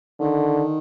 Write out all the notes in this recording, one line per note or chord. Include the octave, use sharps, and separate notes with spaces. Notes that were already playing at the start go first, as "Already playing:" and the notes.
D3 D#3